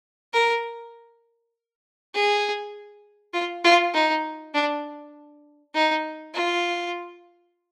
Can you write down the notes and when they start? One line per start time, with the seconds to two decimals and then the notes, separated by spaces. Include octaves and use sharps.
0.33 A#4
2.14 G#4
3.34 F4
3.64 F4
3.94 D#4
4.55 D4
5.75 D#4
6.35 F4